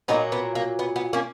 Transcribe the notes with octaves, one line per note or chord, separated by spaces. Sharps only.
A#2 F#3 A#3 B3 D#4
B3
A#3
B3
B3
A#3 C#4